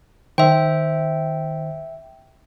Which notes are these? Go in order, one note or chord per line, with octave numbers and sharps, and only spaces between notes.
D#3 C5 E5 G5